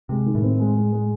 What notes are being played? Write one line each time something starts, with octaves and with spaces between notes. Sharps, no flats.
C3 G#3
D#3
A2
C4
G#3
G#3
G#3